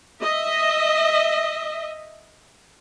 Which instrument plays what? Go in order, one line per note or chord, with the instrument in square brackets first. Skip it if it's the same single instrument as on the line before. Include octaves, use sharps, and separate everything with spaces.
[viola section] D#5 E5